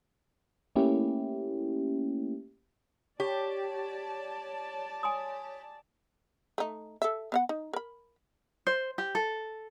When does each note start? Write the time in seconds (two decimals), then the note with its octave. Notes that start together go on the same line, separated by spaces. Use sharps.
0.76 A3 A#3 C#4 E4 G4
3.20 G4 C#5 D5 A5
5.03 G#5 C6 D#6
6.58 A3 D#4
7.02 A4 E5
7.32 B3 F5 F#5
7.49 D#4
7.73 A#4 B5
8.67 C5
8.98 G4
9.15 A4